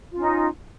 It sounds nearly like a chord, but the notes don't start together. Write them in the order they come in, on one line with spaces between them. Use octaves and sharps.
F4 C#4 D#4